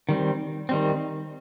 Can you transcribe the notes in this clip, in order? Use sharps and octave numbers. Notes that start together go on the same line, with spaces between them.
D#3 G3 C4
D#3 G3 C4